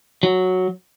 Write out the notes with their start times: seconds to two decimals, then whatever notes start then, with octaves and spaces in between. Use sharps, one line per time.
0.23 F#3